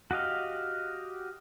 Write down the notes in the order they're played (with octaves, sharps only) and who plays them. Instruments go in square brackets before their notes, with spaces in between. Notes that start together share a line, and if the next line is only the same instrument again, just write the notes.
[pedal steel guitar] F#4 G4 D#5 F5